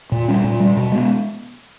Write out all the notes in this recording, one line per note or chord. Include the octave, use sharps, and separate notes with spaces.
A#2
G3 C#4
A#2
G3 C#4
B2
G#3 B3